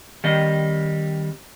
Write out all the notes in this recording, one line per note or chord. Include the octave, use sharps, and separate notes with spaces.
D#3 G3 C4 D#5